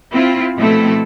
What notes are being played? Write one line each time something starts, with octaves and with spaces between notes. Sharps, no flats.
C4 E4 F4
B2 F3 A3 C4 E4 A4